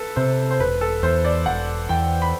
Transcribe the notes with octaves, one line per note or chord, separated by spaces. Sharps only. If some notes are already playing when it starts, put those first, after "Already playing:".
Already playing: A4 B4
C3 C5
C5
E1 B4
A4
E2 C5
D5
E1 F#5
E2 G5
B5